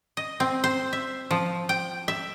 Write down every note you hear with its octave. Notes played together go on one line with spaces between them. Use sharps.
D#5
C4
C5
E5
F3
G5
E5